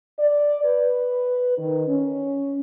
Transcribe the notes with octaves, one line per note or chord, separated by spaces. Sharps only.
D5
B4
D#3
C#4